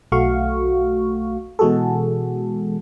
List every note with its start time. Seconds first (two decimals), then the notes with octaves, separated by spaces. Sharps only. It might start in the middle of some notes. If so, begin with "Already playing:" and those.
0.12 B1 A3 F#4 F5 C#6
1.59 B2 E3 G#3 F#4 G#4 A4